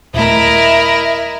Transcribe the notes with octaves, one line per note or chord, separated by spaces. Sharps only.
D#1 A3 E4 A#4 D#5 E5